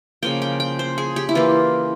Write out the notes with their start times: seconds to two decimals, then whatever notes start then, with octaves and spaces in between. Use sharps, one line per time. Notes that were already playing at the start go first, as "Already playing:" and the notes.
0.23 C#3 F3 A#3 G5
0.42 G5
0.60 G5
0.79 C5
0.98 G#4
1.16 G4
1.29 E4
1.35 E3 A#3 F4